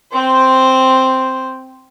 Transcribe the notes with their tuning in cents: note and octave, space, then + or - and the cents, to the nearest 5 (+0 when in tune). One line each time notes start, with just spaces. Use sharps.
C4 +0 C5 +0